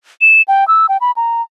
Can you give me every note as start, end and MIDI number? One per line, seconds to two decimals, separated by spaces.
0.21 0.42 100
0.48 0.67 79
0.68 0.86 88
0.89 0.97 79
1.01 1.11 83
1.16 1.42 82